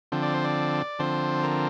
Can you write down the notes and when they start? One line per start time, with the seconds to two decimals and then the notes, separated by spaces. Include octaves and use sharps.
0.12 D3 F3 C4
0.23 D5
0.34 C5
0.44 D5
0.99 D3 F3 C4 C5
1.43 A#4